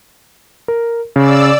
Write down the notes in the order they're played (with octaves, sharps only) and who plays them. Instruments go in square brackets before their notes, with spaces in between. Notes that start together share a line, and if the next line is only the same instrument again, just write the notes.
[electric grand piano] A#4
[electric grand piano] C#3 [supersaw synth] D5 E6